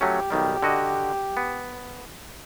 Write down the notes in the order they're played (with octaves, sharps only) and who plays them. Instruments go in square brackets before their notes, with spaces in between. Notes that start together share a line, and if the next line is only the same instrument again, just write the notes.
[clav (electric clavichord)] F#3 A3 C#4 [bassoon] G4
[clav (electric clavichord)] B1 D#3 G3
D3 F#4 D#5
B3